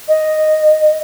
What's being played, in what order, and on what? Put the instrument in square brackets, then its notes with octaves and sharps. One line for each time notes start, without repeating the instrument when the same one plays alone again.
[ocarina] D#5